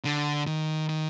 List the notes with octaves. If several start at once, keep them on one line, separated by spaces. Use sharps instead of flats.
D3
D#3
D#3